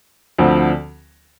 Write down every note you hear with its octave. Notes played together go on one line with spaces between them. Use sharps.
D2 D3 F3 C4